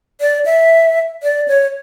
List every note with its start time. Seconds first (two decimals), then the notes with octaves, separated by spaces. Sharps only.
0.21 D5
0.45 E5
1.23 D5
1.48 C#5